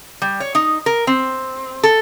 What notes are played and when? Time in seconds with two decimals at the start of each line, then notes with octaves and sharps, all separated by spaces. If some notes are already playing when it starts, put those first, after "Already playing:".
0.22 G3
0.40 C#5
0.55 D#4
0.86 A#4
1.07 C4
1.83 A4